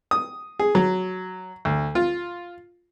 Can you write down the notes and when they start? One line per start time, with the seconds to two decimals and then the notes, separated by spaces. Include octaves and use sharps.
0.11 D#6
0.59 G#4
0.75 F#3
1.65 D2
1.95 F4